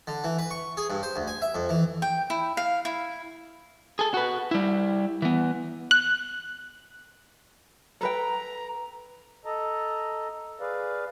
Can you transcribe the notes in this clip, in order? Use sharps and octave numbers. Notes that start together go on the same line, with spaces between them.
D3
E3
B4
C#6
G#4
G2
C5
D2
G#5
E5
F2
E3
G5
E4
F5
E4
G#4 A4
F#4 B4
G3 E4
E3 B3
F#6
A4 B4 G5 A#5
A4 D#5 A5 A#5
G#4 B4 D5 F5